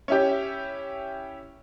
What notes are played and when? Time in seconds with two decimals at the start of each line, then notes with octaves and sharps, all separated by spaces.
0.08 C#4 E4 G4